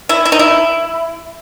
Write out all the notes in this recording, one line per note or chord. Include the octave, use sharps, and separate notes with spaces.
E4
E4
D#4
E4